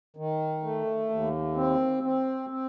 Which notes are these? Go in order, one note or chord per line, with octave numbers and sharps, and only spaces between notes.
D#3
A3
D#2
C4
C4
C4